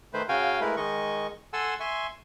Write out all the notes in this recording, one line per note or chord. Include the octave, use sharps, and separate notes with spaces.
D#3 A3 B4 C5
C#3 F#4 F5 G5 G#5
G#3 A3 E4 A#4 B4
D#3 G#3 D#5 C#6
A4 F#5 G#5 A5 C6 E6
E5 G#5 C6 C#6